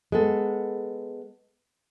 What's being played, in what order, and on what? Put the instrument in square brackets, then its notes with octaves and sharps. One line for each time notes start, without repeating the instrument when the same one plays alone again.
[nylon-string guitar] G#3 B3 A4